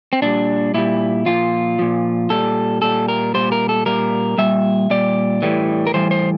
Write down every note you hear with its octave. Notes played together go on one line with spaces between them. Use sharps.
C4
A#2 G3 D4
A#2 G3 E4
A#2 F3 F4
A#2 F3
A#2 G3 A4
A#2 G3 A4
A#4
A#2 G3 C5
A#4
A4
A#2 G3 A#4
A#2 G3 E5
A#2 G3 D5
A2 E3 G3
A#4
A2 E3 G3 C5
C5